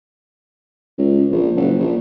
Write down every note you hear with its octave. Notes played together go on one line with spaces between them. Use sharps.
C#2
A#1
F#1
A#1